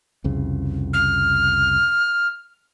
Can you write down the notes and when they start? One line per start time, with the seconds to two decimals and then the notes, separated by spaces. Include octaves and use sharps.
0.24 C2 F2 C#3
0.93 F6